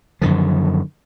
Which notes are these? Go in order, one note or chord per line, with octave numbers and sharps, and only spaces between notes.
F#2 D3 D#3 F3